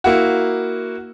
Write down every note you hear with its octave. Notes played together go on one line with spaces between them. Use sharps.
A#3 E4 F#4